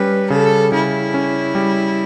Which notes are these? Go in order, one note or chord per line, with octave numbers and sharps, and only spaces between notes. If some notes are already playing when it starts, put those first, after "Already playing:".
Already playing: G3 C#4 B4
C#3 A4
C#3 E4
C#4
G3